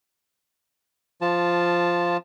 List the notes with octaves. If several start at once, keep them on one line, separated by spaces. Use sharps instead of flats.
F3 F4 A5